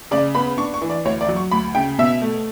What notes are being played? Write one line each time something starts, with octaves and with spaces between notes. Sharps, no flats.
C#3 D5
B3 B5
D4 C#6
C#6
E3
D5
D2 C#5
D5
F#3
C#6
D2 B5
C#3 G5
B2 E5
A3